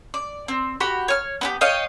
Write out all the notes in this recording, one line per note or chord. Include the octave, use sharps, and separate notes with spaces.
D5
C4
F#4 G4 B5
C#5 F6
B3 D4 G4
C#5 D#5 F5 G5